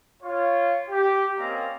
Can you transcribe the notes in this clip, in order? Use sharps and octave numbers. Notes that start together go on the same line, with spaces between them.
F4 C#5
G4
A#3 C4 C#4 D5 D#5 A#5